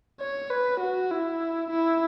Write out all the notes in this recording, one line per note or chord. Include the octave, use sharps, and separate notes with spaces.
C#5
B4
F#4
E4
E4